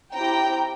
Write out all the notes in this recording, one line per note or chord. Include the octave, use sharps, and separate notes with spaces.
C4 E4 G4 G5 A#5